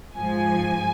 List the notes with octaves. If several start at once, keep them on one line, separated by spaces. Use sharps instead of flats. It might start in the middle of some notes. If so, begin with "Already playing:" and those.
G#2 F3 G#5